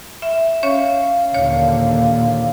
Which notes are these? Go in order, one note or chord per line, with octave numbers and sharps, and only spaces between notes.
E5
C#4 C#5 F5
D#2 A#2 D3 C#5